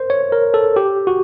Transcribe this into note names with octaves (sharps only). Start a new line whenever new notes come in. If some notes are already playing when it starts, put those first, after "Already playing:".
Already playing: A#4 C5
C#5
A#4
A4
G4
F#4